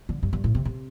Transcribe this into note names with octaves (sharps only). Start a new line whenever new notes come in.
D3
G2
G2
A2
C3
C3